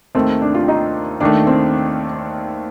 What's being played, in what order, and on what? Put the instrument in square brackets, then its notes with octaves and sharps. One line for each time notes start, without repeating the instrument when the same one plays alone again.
[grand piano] D#2 D#3 A3 [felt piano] C4
[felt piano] D4
F4
D#4
[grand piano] D#2 D#3 A3 [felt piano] D4
[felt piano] C4